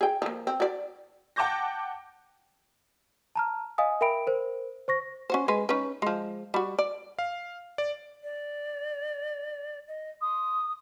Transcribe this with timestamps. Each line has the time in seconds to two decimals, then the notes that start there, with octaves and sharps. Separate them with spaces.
0.01 G#4 G5
0.22 F3 A#3
0.47 C4
0.60 F#4 D5
1.36 F#5 G5 A5 D6 G6 A#6
3.35 A5 A#5 F6
3.78 D#5 F5 G#5 D#6
4.01 A#4 E5 G5 B5 D7
4.27 A#4 C5
4.88 C5 C#6 A#6
5.30 C#4 F#4 C5
5.48 G#3 G#4 B4
5.69 C#4 D#4 B4
6.02 F3 G#3
6.54 G3 F#4
6.79 D5
7.19 F5
7.78 D5
8.23 D5
9.88 D#5
10.21 C6 D#6